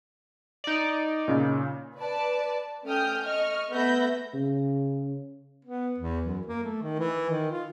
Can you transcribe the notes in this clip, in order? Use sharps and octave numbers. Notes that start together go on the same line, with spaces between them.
D#4 D5
A#2 C#3
B4 D5 A5
A3 C#4 G5 D#6 F6 G6
D#5 C#6 F6
A3 B3 E5 B5 G6 A#6
C#3
B3
E2
F#2
A#3
A3
D#3
E3
D#3
F4